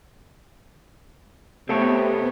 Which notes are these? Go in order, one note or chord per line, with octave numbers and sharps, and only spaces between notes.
C3 A3 B3 C4 A4 C#5